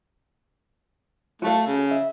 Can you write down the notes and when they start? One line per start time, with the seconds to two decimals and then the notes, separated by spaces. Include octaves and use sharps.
1.42 A3 F#4 A4 F5
1.67 C#3
1.91 E5